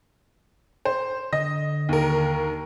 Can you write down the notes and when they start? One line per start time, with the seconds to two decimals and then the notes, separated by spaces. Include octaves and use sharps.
0.85 C5
1.33 D3 D#5
1.89 D#2 A#4